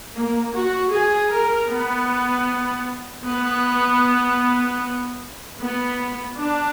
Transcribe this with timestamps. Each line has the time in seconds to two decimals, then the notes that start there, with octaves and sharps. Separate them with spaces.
0.14 A#3
0.53 F#4
0.91 G#4
1.30 A#4
1.69 B3
3.25 B3
5.59 B3
6.37 D4